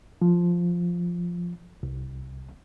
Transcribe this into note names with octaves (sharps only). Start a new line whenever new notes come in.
F3
C2